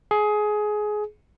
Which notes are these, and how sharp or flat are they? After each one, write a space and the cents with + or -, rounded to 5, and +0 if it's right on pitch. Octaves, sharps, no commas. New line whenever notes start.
G#4 +20